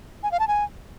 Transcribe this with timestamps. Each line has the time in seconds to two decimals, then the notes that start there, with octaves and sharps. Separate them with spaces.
0.23 G#5
0.31 F5
0.40 A5
0.48 G#5